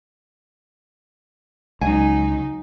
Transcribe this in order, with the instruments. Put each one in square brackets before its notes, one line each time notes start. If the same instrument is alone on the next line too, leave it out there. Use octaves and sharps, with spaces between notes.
[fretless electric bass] C#2 [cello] F#3 D#4 [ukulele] G#5